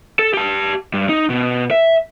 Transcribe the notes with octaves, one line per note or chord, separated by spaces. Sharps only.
A4
G4 A5
G2
D#4
B2
E5